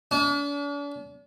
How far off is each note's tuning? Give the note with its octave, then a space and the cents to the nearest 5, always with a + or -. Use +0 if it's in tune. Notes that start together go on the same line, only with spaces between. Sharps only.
D4 -45